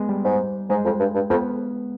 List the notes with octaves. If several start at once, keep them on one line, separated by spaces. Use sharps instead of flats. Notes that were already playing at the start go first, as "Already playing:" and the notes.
Already playing: G#3 B3
G3
G#2
G#2 G#3
F2
G2
G2
F2 B3